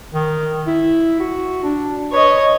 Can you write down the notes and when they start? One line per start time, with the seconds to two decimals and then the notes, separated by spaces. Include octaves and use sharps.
0.14 D#3
0.67 E4
1.20 F#4
1.63 D4
2.12 B4 C#5 D#5